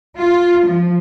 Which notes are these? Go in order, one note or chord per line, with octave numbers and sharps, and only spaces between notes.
F4
F3